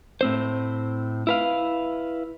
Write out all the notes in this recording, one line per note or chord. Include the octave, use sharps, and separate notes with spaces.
A2 C4 C5
E4 B4 F5